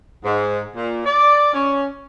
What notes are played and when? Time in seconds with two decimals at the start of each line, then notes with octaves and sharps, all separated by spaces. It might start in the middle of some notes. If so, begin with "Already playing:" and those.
0.24 G#2
0.75 A#2
1.06 D5
1.53 C#4